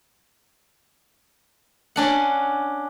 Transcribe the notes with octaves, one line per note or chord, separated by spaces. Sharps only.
C#4 D4 F#5